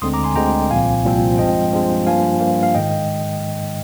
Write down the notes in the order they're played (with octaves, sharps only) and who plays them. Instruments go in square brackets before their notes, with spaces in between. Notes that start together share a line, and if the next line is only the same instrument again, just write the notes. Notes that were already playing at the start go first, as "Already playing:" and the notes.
[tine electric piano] D2 D3 G#3 C4 C6 D#6
A#5 D6
G#5 C6
D2 D3 G#3 C4 G5 A#5
C2 A#2 F3 C4 F5 G#5
C2 A#2 F3 C4
G2 F3 G#3 C4 D#5 G5
G2 F3 G#3 C4
G2 F3 A#3 F5 G#5
G2 F3 A#3
F5
G#2 D#3 G#3 D#5 G5